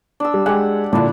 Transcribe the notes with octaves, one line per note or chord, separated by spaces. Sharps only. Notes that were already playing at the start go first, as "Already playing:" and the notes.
D4 E6
G3
G#3 G4 F#5 G#5
A#2 D3 D4 E4 A5